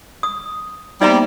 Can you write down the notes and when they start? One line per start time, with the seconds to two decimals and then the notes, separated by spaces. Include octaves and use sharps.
0.23 D#6
1.01 G3 A#3 B3 D#4 C5 E5 A#5